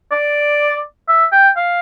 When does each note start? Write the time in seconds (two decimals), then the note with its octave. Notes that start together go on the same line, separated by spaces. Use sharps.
0.12 D5
1.08 E5
1.32 G5
1.57 F5